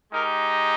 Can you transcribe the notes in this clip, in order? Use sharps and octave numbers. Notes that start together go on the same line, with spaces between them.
G#3 D#4 G4 A#4